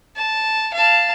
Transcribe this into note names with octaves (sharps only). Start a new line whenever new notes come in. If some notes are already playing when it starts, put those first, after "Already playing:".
A5
F5 A5